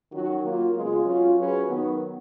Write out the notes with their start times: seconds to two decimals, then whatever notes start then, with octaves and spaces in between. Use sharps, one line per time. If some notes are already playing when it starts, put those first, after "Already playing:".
0.12 D#3 F#3 C#4 F#4
0.43 F#3 A#3 F4
0.74 C#3 G#3 B3 F4
1.05 F#3 C#4 F4
1.37 F#3 C#4 G#4 B4
1.68 D#3 F#3 B3